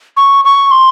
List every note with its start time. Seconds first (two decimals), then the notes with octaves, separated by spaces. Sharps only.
0.17 C#6
0.45 C#6
0.71 C6